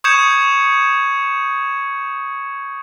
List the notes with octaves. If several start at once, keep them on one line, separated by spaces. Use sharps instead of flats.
C#6 D#6 G6 G#6 C#7 E7